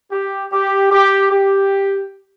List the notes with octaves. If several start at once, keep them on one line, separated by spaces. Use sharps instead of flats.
G4
G4
G4
G4